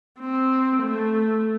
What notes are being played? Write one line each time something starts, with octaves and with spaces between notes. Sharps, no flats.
C4
A3